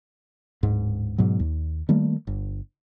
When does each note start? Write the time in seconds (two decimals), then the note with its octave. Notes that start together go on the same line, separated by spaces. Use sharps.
0.63 D1 G#2
1.18 G#2 B2 F#3
1.39 D#2
1.89 D#3 G3 A3 A#3
2.27 G1